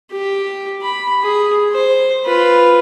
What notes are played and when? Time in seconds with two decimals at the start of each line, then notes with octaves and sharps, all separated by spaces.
0.13 G4
0.83 B5
1.23 G#4
1.72 C5
2.26 F4 B4